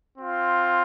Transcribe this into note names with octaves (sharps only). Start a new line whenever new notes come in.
C4 F4